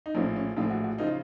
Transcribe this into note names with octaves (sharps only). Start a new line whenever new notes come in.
D#4
A#1 A2 F3 C#4
C#4
A#1 A2 F3 F4
F#4
F#4
C#3 F3 D#4
F4